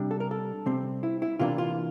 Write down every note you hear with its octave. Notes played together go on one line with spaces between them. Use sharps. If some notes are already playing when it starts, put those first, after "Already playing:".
Already playing: C3 G3 D4
A4
A#4
A4
C3 G3 C4
E4
E4
C3 E3 A#3 D4 F4
F4